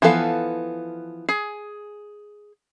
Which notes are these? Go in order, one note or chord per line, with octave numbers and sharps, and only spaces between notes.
E3 F3 B3 A4 F5
G#4